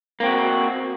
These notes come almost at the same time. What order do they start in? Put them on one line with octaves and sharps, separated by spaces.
A#3 C4 F#4